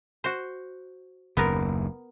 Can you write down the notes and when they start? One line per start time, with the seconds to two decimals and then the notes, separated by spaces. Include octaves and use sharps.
0.24 F#4 C5
1.37 F#1 D#2 B3 A#4